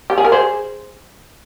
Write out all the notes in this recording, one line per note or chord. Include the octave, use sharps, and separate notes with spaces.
G4
G#4
A#4
G#4 C5